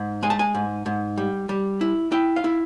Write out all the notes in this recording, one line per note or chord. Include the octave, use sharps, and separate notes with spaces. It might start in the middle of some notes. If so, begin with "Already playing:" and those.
Already playing: G#2
G#3 G#5
A5
G#5
G#2
G#2
G3
G3
E4
E4 G5
F5
E4